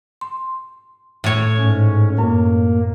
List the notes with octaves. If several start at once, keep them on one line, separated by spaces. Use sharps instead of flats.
C6
A2 C#5
G#2 C#4
F#2 A#3